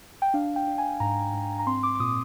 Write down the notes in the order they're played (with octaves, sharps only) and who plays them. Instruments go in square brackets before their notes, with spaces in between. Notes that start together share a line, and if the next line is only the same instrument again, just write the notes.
[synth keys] G5
D4 F5
G5
D4
G#5
G#2 A#5
G#2
A#5
C4 C6
D6
D6
A#2 D#6